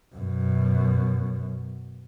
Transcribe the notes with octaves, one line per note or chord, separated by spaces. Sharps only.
F#2 B2